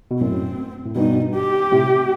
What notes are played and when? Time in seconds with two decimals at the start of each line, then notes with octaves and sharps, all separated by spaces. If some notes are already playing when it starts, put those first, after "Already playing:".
0.11 B2
0.20 F#2 A2 C4
0.86 A2
0.96 G2 B2 D#4
1.34 G4
1.71 A2 C3